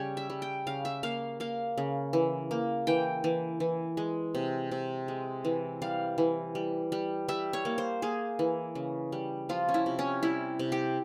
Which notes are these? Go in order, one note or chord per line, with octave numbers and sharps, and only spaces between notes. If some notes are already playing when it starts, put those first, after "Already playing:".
Already playing: C#3 G3 C#5 G5
E5
G3
G5
C#3 F5
E5
A#3 F5
A#3 F5
C#3
E3
A#3
E3 G5
E3
E3
G#3
C3
C3
G#3
E3
G3 F5
E3
G3
G3
G3 E5
C#5
A#3
C5
A#3 G#4
E3
C#3
G3
F3 F4
C#4
E4
C3
C#4
G3 E4
C3
G4